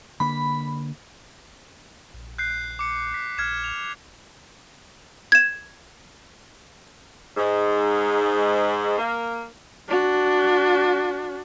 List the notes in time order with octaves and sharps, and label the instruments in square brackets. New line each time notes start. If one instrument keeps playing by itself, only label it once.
[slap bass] D3 A#3 [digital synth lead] B5
[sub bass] A#1
[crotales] F#6 G6 C7
D6 C#7
B6
[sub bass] A#1 [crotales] F6 G#6 E7
[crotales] F7
[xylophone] G#6 E7
[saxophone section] G#2
A#3
[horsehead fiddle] D4 F#4